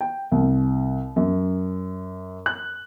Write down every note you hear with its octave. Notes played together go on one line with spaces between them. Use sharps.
G5
C2
F#2
F#6